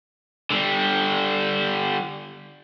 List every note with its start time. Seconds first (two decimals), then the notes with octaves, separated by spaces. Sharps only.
0.51 D3 G3